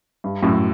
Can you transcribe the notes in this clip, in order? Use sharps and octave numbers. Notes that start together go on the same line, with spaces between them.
G2
F#2 A2